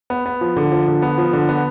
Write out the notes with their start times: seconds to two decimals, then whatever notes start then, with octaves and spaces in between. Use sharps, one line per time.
0.10 B3
0.26 B3
0.41 F3
0.56 D3
0.72 F3
0.88 D3
1.02 B3
1.18 F3
1.33 D3
1.49 B3